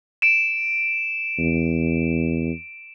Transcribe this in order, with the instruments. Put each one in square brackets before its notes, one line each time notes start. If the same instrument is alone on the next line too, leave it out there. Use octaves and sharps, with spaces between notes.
[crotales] D7 E7
[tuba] E2